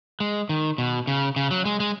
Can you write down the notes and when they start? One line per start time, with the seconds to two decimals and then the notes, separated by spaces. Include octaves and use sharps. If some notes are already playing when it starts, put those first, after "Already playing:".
0.20 G#3
0.49 D#3
0.78 B2
1.07 C#3
1.36 C#3
1.51 F#3
1.65 G#3
1.80 G#3